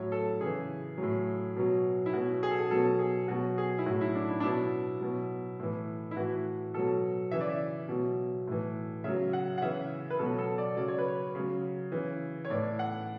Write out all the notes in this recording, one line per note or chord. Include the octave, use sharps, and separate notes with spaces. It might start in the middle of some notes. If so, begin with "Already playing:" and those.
Already playing: A2 F#3 C#5
A4
C#3 E3 G#4
F#3
A2
B2 F#3
E4
B2 F#3 F#4
G#4
A4
G#4
B2 F#3 A4
G#4
B2 F#3 F#4
G#4
E4
A2 F#3 F#4
E4
D4
E4
D4
B2 F#3 E4
B2 F#3
A2 E3
E4
A2 E3 F#4
B2 F#3 A4
C#3 E3 E5
D5
E5
B2 F#3
A2 E3
C#3 F#3 E5
F#5
F#5
C#3 E3 E5
B4
B2 F#3 A4
A4
D5
C#3 F#3 D5
C#5
B4
C#5
C#3 F#3
C#3 E3
C#5
A2 E3 D5
F#5